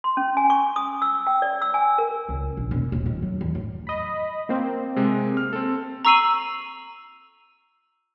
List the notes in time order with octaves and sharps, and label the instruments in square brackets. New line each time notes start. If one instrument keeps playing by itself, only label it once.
[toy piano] C6
C#4
G#5
C#6
D#6
E6
G5
D5
E6
G#5
A#4
[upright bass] C#2
A#1
E1
D#1
D#3
F#3
E2
D1
[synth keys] D#5 B5
A#3 C4
[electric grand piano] C3 G#3
F6
C4 A4
[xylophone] A#5 C#6 E6 C7 D#7 F#7